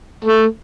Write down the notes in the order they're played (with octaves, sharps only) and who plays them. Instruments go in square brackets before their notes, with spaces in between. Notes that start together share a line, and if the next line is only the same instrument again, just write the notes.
[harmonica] A3